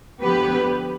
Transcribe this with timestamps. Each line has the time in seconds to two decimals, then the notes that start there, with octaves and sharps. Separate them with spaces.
0.20 D3 F3 B3 G4 B4